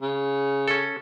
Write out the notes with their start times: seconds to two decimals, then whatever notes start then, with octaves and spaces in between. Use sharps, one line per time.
0.02 C#3
0.68 C#4 A4